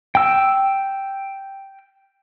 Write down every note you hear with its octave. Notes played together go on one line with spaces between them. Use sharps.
G5 E6